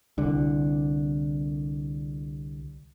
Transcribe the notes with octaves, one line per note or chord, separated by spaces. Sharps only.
C2 D3